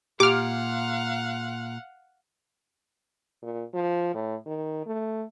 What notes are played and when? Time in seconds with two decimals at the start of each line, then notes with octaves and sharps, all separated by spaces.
0.20 A#2 G4 F5 F#5 D6 F6
3.42 A#2
3.74 F3
4.14 A2
4.46 D#3
4.86 A3